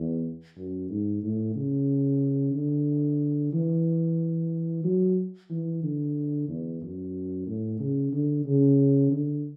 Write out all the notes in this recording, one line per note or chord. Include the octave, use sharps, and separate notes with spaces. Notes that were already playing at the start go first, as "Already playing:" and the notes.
Already playing: E2
F#2
G#2
A2
C#3
D3
E3
F#3
E3
D3
E2
F#2
A2
C#3
D3
C#3
D3